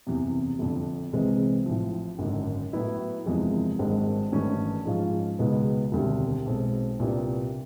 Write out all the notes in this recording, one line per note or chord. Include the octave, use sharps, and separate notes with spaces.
F#1 E2 C3
G1 F2 D3
C2 C3 E3 G#3 C4
A1 A2 F3
G#1 F#2 D3
A2 F#3 B3 E4
F#1 E2 C3 F3 G#3
G#1 G2 D#3 G#3 C4
G#1 G2 E3 A3 C#4
G#2 F3 G#3 C#4 F4
C#2 B2 G#3 B3 D#4
E1 D2 C3 D#3 G3
B1 B2 G#3 C4
C2 A#2 G3 B3 D4